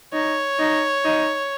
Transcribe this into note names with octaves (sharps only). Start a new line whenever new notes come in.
D#4 C#5
D#4
D#4